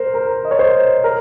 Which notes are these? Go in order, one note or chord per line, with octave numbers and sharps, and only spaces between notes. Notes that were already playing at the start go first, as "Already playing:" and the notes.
Already playing: A#4 C5
A#4
D#5
C#5
C5
A#4